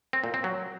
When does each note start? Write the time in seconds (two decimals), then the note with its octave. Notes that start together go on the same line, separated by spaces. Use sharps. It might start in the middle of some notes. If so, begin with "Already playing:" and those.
0.13 C4
0.24 A#2
0.34 C4
0.44 F#3